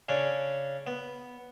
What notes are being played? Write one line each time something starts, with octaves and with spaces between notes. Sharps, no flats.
C#3 C#4 D4
B3